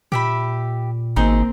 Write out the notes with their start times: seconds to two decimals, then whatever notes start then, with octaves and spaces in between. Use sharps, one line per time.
0.12 A#2 G4 E5 B5
1.16 G#1 A#3 C4 D#4 G#4 C5